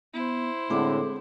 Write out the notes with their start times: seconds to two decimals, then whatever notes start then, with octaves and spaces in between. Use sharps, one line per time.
0.14 B3 E4 C5
0.70 A2 D3 G#3 C4 D6